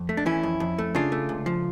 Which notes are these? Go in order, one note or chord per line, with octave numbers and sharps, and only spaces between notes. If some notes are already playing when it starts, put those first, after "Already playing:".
Already playing: F2
A3
D4
E3 C#4 E4
F2
F2
A3
C#3 D4 F4
A3
C#2
F3